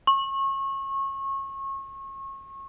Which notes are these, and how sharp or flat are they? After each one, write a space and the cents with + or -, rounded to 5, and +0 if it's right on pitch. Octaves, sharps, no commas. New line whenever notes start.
C#6 -30